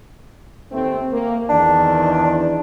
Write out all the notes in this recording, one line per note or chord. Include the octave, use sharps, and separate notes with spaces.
D#2 A3 C4
A#3
E2 D#3 D4